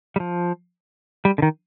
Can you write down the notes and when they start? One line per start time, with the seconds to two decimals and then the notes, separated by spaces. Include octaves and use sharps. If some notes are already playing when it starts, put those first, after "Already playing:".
0.16 G3
0.20 F3
1.25 G3
1.38 D3
1.42 D#3